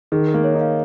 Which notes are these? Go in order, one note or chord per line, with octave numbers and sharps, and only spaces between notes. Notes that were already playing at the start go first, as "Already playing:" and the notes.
D#3 G#4
A#4
A#3
C#5
D#4
F5